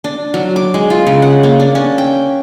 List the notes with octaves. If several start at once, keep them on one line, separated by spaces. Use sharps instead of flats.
D4
F#3
D6
G#3
F4
C#3
F#5
A#3
D4
C#4
G5